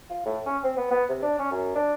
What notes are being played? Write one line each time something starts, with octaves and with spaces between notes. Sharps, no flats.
F4
A2
C#4
C4
B3
B3
C3
D4
C#4
F#2
D4